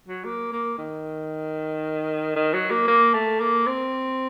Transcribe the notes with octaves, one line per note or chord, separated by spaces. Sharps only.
F#3
A#3
A#3
D#3
D#3
F#3
A#3
A#3
A3
A#3
C4